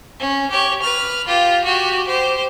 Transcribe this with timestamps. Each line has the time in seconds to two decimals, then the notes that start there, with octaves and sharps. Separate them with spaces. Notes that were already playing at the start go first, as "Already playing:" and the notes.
0.19 C#4
0.51 G4 C#5
0.82 B4 F6
1.27 F4 G4
1.64 F#4 G4
2.07 G4 C5